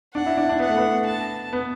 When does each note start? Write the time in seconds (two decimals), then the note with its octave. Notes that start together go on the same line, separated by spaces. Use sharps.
0.14 D4 F#5
0.26 E4
0.37 D4
0.49 D4
0.59 B3 F#5
0.69 A3
0.78 B3
1.07 A5
1.53 B3